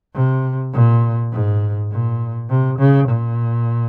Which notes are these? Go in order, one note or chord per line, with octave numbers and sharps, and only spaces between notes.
C3
A#2
G#2
A#2
C3
C#3
A#2